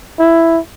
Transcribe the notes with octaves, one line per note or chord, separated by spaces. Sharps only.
E4